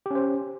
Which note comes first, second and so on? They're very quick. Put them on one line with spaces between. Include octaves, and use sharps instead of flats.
G4 C#4 C5